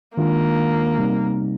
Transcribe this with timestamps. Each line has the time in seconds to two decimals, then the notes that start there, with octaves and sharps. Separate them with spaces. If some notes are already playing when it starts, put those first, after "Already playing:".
0.17 D#3 G#3 A#3 D4 F4
0.98 C3 G3 C4 D#4